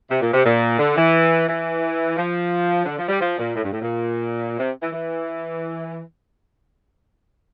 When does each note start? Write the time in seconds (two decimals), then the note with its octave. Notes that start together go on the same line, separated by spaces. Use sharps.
0.11 C3
0.21 A#2
0.33 C3
0.45 A#2
0.79 D3
0.97 E3
1.49 E3
2.17 F3
2.86 D3
2.99 F3
3.09 G3
3.20 F3
3.38 A#2
3.55 A2
3.64 G2
3.73 A2
3.82 A#2
4.59 C3
4.83 E3
4.93 E3